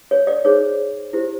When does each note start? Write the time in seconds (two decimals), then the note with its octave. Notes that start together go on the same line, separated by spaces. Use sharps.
0.11 C#5
0.27 D5
0.45 D#4 G#4 C5 C#5
1.13 E4 G4 C5